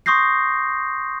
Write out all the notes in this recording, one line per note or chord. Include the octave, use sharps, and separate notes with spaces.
C6 C#6 D#6 G6 A#6 C7